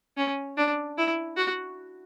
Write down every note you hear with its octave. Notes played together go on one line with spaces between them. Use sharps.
C#4
D4
E4
F#4